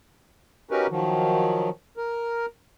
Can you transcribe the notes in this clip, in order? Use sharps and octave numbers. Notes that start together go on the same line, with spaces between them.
C#4 D#4 F#4 G4 A#4 B4
D#3 F3 F#3
A#4